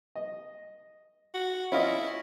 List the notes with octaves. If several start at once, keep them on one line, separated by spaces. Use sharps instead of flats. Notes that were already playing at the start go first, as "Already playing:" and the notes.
D#5
F#4
C#4 E4 F4 D#5